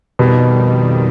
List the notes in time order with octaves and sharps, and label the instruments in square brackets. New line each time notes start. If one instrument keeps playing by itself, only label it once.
[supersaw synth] F2 D#3 G3 [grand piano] B2